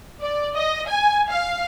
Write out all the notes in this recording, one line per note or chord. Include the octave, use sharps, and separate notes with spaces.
D5
D#5
G#5
F5